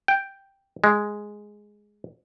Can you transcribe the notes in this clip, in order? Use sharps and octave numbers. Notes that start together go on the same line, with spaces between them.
G5
G#3